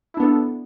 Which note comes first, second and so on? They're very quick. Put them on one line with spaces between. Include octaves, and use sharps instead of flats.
E4 D4 B3 A4